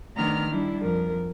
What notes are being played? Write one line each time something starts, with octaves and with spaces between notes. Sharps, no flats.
D#3 A3 B3 D4 A#5 F6
G3 D4 E4
F2 A#4